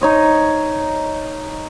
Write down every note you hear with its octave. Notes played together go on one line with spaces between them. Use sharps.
D#4 C#5 D#5